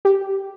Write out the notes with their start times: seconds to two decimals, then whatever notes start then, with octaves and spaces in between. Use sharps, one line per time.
0.05 G4